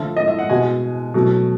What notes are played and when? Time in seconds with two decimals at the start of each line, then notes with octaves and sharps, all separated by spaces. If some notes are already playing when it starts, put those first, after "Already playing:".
Already playing: D3 F3 A3 E5
0.17 D#5
0.28 E5
0.39 F#5
0.50 B2 G#3 G#5
1.14 B2 F#3 A3